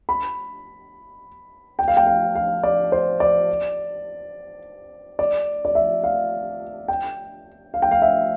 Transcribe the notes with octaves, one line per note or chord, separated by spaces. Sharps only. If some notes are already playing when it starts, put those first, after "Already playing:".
B5
G5
F5
G5
F5
F5
D5
C5
D5
D5
D5
E5
F5
G5
F5
G5
F5
E5